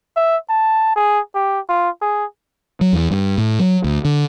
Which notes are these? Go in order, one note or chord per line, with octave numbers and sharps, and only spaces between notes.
E5
A5
G#4
G4
F4
G#4
F#3
E2
G2
A2
F#3
D2
D3